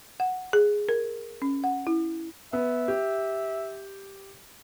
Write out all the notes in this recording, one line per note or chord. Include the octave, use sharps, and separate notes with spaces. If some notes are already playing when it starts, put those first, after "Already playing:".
F#5
G#4
A#4
C#4
F#5
E4
B3 E5
G4